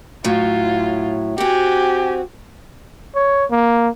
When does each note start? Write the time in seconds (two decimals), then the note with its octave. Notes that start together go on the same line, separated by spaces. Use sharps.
0.24 A2 F#3 F4
1.38 C4 F#4 G4 G#5
3.15 C#5
3.51 A#3